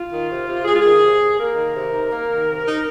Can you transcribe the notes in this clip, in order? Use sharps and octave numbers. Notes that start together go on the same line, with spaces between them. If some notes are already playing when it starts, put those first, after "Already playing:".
Already playing: F4
D#3
C3
C3
G#3 G#4
F4
D#3 G#4
C3
C3
A#3 A#4
D#3
C3
D#4
A#3
D#3
C3
D#4